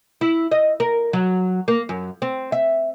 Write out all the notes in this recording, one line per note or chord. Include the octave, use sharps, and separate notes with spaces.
E4
D#5
A#4
F#3
A#3
F#2
C4
E5